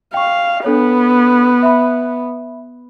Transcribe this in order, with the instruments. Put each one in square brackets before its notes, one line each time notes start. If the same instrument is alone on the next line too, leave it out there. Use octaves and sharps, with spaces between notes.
[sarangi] F5 [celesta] G5 C#6
[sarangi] B3 [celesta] D4 A4 C#5
[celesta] E5 B5